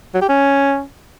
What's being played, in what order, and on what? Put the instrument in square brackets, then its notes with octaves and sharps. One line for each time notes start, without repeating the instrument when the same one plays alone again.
[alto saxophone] F#3
G4
C#4